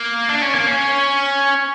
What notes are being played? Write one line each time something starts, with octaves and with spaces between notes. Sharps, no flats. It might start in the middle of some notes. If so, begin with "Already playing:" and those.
Already playing: A#3
D4
C#4
A#3
C#4